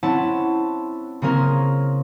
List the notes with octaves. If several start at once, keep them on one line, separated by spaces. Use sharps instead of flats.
C4 C#4 E4 F#5 A5
C#3 A#3 C4 C#4 G#4 A#4